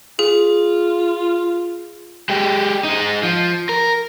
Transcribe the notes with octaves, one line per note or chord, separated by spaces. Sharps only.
F4 G#4
G#3 G4
G#3 D#4
F3
A#4